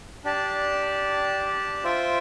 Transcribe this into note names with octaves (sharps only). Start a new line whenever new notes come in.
D4 G4 D5 A5
F4 C5 E5 G5